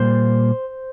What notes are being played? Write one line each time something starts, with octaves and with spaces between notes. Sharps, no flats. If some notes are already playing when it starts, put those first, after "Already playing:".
Already playing: A#2 G3 A#3 C5